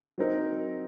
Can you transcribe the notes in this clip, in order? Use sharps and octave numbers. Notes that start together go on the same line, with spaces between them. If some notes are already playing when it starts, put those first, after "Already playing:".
F#3 C4 D#4 A#4